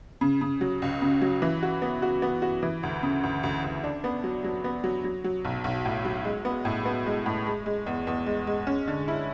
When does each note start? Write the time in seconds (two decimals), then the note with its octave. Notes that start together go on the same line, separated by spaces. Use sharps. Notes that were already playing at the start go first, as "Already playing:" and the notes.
0.21 C#3
0.41 C#3
0.61 F#3
0.82 C#2
1.02 C#3
1.21 F#3
1.42 E3
1.63 F#4
1.82 B3
2.02 F#4
2.22 B3
2.42 F#4
2.63 E3
2.83 D2
3.03 C#3
3.23 D2
3.43 D2
3.64 D2
3.84 D4
4.04 B3
4.24 F#3
4.44 F#3
4.64 B3
4.84 F#3
5.04 F#3
5.24 F#3
5.45 B1
5.64 B1
5.85 A2
6.05 F#3
6.25 G#3
6.45 B3
6.65 A2
6.85 B3
7.06 G#3
7.26 A2
7.47 G#3
7.66 G#3
7.86 E2
8.07 E2
8.26 G#3
8.47 G#3
8.67 C#4
8.87 D3
9.08 E4